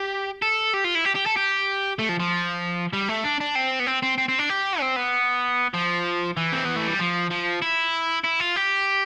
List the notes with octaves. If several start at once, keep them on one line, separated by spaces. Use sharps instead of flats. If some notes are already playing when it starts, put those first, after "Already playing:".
Already playing: G4
A4
G4
F4
E4
G4
G4
A4
G4
A3
F3
F3
G3
A3
D4
D4
C4
B3
C4
C4
C4
C4
D4
G4
C4
B3
F3
E3
C4
B3
A3
G3
F3
F3
E4
E4
F4
G4